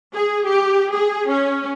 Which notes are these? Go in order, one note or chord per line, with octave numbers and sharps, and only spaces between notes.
G#4
G4
G#4
C#4